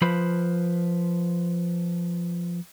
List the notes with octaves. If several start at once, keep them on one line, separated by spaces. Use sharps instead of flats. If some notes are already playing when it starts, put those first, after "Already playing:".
F3 F4 B4 C5 B5